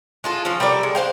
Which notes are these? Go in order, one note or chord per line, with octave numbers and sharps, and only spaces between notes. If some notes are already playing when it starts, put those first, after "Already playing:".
G#3 F4 A4
F3 C#4
G3 A4 A#4 D5
G#3
D4 C5 F5 G5